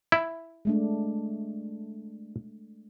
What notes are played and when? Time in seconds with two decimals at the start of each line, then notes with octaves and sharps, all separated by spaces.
0.12 E4
0.65 G#3 A3 D4